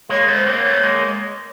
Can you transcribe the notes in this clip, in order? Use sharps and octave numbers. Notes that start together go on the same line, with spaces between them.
G#3 A#3 C#5
A3 B3
C5
A#3 C4
C#5
A3 B3
G#3 A#3